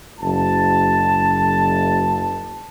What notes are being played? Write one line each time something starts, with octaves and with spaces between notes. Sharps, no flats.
F#1 A5